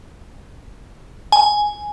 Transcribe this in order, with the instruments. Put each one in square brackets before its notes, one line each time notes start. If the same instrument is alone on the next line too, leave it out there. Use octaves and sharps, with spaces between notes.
[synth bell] G#5